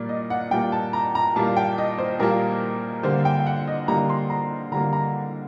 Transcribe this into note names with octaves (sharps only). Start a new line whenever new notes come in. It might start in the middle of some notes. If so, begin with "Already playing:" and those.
Already playing: A#2 G3 A#3 D5
D#5
F#5
A#2 G3 A#3 G5
A5
A#5
A#5
A#2 G3 A#3 A5
G5
D#5
C5
A#2 G3 A#3 A#4
D3 G3 A#3 C5
G5
G5
F#5
D#5
D3 G3 A#3 A#5
C6
A#5
D3 G3 A#3 A#5
A#5